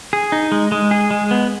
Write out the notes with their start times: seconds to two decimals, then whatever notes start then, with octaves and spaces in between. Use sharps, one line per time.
0.13 G#4
0.32 D#4
0.52 G#3
0.72 G#3
0.91 G#4
1.11 G#3
1.31 B3